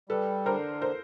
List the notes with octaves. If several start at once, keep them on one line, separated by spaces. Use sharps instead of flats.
G3 A4 B4
D3 A#4 C5
A#4 C5